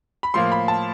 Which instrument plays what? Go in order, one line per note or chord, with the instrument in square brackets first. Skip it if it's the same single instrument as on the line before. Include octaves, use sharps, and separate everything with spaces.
[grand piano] B5
A2 F3 A#3 C6
B5
A5